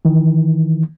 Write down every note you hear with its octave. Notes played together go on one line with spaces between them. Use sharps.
D#3 E3